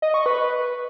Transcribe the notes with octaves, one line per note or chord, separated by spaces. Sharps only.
D#5
C#6
B4